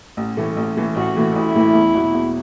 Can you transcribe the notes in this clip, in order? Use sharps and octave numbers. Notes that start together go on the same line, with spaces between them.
A1
A2 E3 A3
A1
A2 E3 A3
A1 F#4
A2 E3 A3
A1 E4
A2 E3 A3
E2
B2 F#3
E2